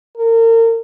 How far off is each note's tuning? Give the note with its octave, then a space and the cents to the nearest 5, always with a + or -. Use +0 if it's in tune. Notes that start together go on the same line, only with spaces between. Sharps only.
A#4 -35